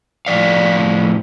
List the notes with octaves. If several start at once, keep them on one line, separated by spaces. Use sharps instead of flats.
A2 F3 D5 F5